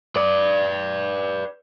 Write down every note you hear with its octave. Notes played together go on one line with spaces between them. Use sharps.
B4 D5